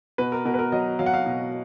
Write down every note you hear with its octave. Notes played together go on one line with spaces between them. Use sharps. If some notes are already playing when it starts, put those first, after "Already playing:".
B2 B4
A#4
B2 A#4
B4
A#4
F#3 D#5
F#3 F5
F#5
F5
B2